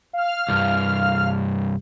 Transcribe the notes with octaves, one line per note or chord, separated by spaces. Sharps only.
F5 F6
C2 G2